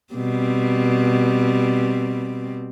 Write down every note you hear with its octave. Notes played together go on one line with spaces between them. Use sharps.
B2 G3 C4